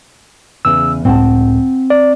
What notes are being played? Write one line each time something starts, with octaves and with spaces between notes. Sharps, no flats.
E2 C#3 E6
C#2 A2 C4 F#5 A5
D5